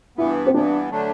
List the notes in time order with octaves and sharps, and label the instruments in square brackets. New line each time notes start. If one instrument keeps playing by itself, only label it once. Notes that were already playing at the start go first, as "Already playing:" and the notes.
[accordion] G2 E3 B3 [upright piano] E4
[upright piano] C4
[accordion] G2 E3 B3 [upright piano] D4
[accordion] D3 F#3 A3 D4